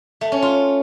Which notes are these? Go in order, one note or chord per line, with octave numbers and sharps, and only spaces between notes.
A3
C#4
F4